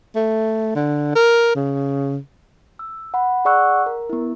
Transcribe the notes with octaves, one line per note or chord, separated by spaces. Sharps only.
A3
D3
A#4
C#3
E6
F#5 B5
G#4 D5 F#5 C#6 E6 F#6
A#4
B3 E4